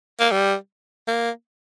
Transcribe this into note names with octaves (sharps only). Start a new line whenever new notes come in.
A#3
G3
A#3